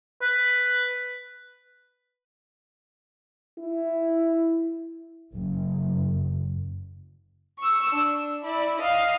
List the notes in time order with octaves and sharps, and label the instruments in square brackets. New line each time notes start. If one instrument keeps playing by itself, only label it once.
[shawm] B4
[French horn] E4
[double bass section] F#1
[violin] C#6 E6
D4
E4 D5
D#5 F5